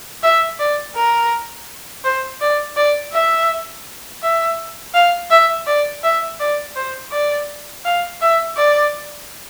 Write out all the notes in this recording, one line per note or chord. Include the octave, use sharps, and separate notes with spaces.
E5
D5
A#4
C5
D5
D5
E5
E5
F5
E5
D5
E5
D5
C5
D5
F5
E5
D5